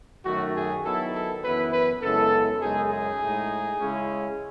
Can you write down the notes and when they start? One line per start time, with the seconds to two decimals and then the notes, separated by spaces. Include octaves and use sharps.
0.25 F#2 D#3 F#3 A3 F#4
0.55 G#4
0.85 D#3 F#3 B3 E4 A4
1.14 A4
1.44 F#2 E3 B3 E4 B4
1.73 B4
2.02 F#2 C#3 G#3 B3 E4 A4
2.61 F#2 C#3 G#3 D#4 G#4
2.91 G#4
3.21 A2 G#3 D#4
3.80 C#3 G#3 C#4 E4